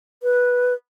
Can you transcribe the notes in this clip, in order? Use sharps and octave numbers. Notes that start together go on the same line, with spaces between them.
B4